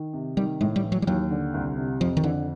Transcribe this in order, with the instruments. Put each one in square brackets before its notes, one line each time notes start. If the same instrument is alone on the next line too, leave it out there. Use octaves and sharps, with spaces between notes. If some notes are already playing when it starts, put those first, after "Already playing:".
Already playing: [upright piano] D#3
C3
[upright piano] D#3 [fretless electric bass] G3
[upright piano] A2 [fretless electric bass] G#3
[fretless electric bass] G3
[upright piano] E3
[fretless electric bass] F#3
G3
[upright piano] D#2 [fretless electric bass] F#3
[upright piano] D3
C2
C3
[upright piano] F2 [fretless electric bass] F3
[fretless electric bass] D#3
[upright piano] D3 [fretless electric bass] E3